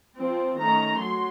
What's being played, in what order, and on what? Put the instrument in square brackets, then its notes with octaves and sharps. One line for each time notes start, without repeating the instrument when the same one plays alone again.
[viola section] F3 C4
D#3 A3 C#4 A#5
F#3 C6